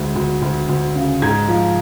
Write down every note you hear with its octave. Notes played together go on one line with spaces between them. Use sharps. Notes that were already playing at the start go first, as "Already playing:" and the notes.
Already playing: D2 G#3
D2
D2
D2
C#3
G#2 G#6
F3